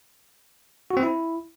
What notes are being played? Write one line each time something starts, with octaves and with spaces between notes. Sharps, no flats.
F#4
C4
E4